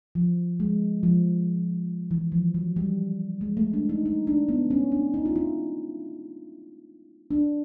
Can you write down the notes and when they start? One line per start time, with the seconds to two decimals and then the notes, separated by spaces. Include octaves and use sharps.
0.15 F3
0.60 G#3
1.03 F3
2.11 E3
2.32 F3
2.54 F#3
2.76 G3
3.41 G#3
3.57 A3
3.73 D4
3.89 D#4
4.06 D#4
4.27 D4
4.48 B3
4.70 C#4
4.92 D4
5.14 D#4
5.26 F4
5.36 E4
7.31 D4